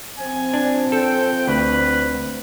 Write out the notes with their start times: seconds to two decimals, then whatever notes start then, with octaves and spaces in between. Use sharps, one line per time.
0.18 F3 C4 G#5
0.54 D4
0.92 A4 G5
1.47 D2 B4